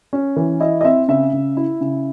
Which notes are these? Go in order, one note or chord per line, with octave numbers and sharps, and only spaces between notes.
C#4
E3
E4 D#5
D#5
C4 E5
C#3 E5
C#3
E4
C#3